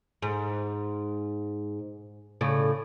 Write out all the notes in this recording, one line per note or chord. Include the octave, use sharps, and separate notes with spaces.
G#2
A2 C#3 D5